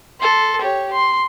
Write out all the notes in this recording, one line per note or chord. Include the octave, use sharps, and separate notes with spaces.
A4 C6
G4 C#5
C6